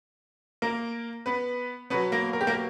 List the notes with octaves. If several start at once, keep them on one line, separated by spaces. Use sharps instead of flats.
A#3 A#4
B3 B4
B2 F#3 B3 B4
A#3 A#4
A#4
G4
A#3 A#4